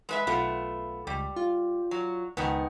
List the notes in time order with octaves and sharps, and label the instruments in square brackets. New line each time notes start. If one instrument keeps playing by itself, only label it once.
[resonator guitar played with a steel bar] G#3 B4 E5
[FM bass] B1 [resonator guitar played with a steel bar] A3 B3 F4
[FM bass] C#2 [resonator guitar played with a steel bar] G3
[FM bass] F4
[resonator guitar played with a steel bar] F#3
[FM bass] C#2 [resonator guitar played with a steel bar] G#2 D#3 B3